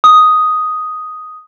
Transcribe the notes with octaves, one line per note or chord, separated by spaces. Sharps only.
D#6